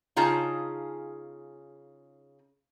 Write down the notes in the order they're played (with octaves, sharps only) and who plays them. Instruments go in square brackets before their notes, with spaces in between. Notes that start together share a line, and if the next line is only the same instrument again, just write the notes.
[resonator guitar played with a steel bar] C#3 D#4 F4 G#4 A5